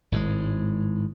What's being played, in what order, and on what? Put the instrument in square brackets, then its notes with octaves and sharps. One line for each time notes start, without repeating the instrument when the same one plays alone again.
[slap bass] G#1 A2 D3 G#3